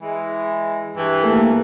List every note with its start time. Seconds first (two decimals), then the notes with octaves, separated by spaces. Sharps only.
0.01 E3 G#3
0.96 G2 E3
1.23 A3 A#3